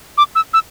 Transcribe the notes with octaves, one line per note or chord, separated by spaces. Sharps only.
D6
E6
E6